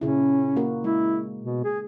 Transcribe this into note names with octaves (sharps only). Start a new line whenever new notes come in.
A#2 C#3 C#4 E4
A#3 F#4 A#4
G#3 E4
B2
G#4